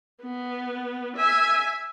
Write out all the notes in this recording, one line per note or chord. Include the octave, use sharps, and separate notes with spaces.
B3
E5 G#5